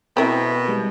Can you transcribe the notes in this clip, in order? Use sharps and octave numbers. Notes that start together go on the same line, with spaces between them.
B2 C4 E4 A#4 C5 E5
G3 G#3